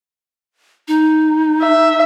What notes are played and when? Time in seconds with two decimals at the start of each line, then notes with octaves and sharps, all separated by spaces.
0.88 D#4
1.62 E5